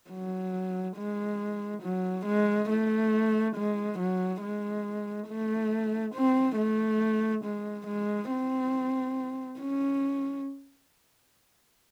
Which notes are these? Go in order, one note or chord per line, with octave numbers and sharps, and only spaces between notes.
F#3
G#3
F#3
G#3
A3
G#3
F#3
G#3
A3
C4
A3
G#3
G#3
C4
C#4